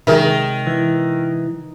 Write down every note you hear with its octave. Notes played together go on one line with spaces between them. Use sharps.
C3 D#3 F#3 G#3 G#4 A#4 E5
E3